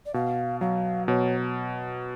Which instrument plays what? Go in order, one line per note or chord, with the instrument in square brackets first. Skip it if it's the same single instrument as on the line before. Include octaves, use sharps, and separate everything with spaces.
[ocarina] D5
[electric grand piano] B2 [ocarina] F5
[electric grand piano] F#3 [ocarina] F5
[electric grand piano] B2 [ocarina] C#5